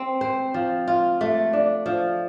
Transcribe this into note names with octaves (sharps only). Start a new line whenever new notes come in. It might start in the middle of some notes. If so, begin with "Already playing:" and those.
Already playing: C4
C5
F3
F4
A3
D4
F3